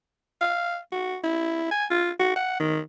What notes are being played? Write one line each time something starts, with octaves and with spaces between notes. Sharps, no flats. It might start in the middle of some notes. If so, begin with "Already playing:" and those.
F5
F#4
E4
G#5
F4
F#4
F#5
D#3